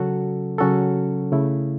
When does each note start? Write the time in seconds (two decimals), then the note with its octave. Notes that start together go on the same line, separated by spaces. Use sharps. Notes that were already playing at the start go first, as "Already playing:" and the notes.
Already playing: C#3 F#3 C#4 F#4 A4
0.58 C#3 F#3 C#4 F#4 A4
1.32 C#3 A3 E4